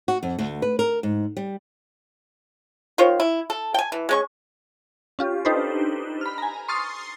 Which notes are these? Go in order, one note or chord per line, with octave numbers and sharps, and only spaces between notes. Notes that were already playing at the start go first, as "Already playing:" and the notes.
F#4
F2
D2
B4
A#4
G#2
G3
D#3 F4 C5 C#5
E4
A4
G5 G#5
E3
G#3 C#4 C#6
C#4 F4 G4
D4 D#4 G4 A4 B4 C5
B5 F6
G#5 A#5
C6 C#6 D#6 F6 A6 C7